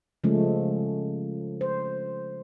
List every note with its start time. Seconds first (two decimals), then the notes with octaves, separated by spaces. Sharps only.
0.24 C#3 F3 G#3 A3 C#4
1.61 C5